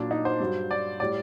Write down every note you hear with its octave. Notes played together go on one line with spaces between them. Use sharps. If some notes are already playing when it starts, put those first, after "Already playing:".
Already playing: A#2 F#3 D4
D#4
C5
G2 F#3
D5
A2 G3 D5